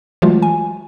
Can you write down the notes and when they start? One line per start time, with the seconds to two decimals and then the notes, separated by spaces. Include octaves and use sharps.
0.22 E3 F#3 G#3 A3 F4 F#4
0.42 G#5